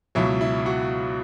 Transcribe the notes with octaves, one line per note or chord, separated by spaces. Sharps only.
C#2 B2 F#3 E4
E4
F#4